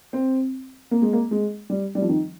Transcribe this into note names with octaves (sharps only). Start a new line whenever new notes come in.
C4
A#3
G#3
A#3
G#3
G3
G3
F3
D#3